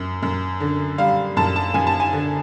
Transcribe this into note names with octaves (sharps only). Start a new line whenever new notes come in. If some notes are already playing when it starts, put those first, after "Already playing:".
Already playing: F#2
F#2
D3
G3 F5
F#2 A5
A5
F#2 G#5
A5
G#5
D3